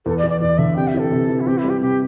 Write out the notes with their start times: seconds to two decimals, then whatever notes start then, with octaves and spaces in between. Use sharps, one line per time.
0.06 E2 A4
0.18 D5
0.24 E2
0.30 D5
0.41 E2 D5
0.58 D3 E5
0.76 C3 G5
0.88 E5
0.94 E3 A4
1.11 C3
1.29 E3
1.40 E4
1.47 C4 G4
1.58 E4
1.64 G3
1.69 G4
1.81 C3 G4